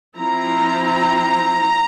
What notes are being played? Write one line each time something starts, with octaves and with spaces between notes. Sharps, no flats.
F3 C4 E4 A#5